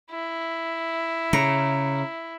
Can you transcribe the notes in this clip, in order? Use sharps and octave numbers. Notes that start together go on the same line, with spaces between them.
E4
C#3 A#5